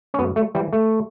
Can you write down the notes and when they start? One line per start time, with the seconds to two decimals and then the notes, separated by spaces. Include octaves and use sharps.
0.14 C#4
0.19 F#2 B3
0.36 A3
0.55 E3 G3
0.73 A3